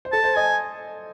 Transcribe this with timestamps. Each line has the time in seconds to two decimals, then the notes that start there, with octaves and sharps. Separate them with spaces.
0.05 C5
0.12 A4 A5
0.24 C5
0.36 D#5 G#5